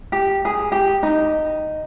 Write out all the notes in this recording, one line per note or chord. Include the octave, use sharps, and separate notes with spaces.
G4
G#4
G4
D#4